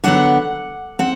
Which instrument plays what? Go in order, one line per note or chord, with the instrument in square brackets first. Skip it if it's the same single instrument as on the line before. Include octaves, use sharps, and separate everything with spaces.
[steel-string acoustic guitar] D3 F#3 B3 F#5
C4 F#5